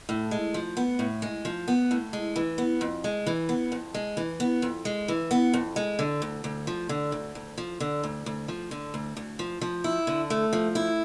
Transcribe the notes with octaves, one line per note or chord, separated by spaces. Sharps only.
A2
G#3
F3
B3
A2
G#3
F3
B3
A2
G#3
E3
B3
F2
G#3
E3
B3
F2
G#3
E3
B3
F2
G#3
E3
B3
F2
G#3
D3
D2
D2
F3
D3
D2
D2
F3
D3
D2
D2
F3
D3
D2
D2
F3
F3
E4
D3
A3
F3
E4